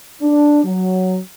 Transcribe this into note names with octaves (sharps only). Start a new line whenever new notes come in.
D4
F#3